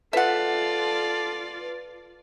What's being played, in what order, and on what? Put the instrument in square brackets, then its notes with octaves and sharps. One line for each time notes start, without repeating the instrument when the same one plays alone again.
[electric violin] F4 D5 [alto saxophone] A4 [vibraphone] B4 [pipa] E5 F#5